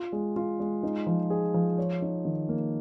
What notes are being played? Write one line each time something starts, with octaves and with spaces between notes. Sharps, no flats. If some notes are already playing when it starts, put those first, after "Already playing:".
Already playing: F4
G#3
F4
G#3
D#4
F3
G#4
F3
C#5
D#4
D#3
A#3